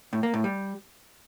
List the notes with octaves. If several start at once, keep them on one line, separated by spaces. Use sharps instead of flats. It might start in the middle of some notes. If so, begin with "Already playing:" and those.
A2
A#3
A2
G3